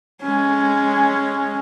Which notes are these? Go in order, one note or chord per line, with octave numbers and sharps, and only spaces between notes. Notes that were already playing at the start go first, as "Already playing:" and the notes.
G#3 C#4